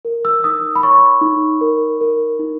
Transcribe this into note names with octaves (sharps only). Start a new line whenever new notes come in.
A#4
E6
D#4 D#6
B5
C#5 C#6
D#4
A#4
A#4
D#4